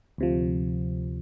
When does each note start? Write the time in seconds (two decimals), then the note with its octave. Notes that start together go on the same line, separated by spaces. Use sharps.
0.18 D2 C3 F3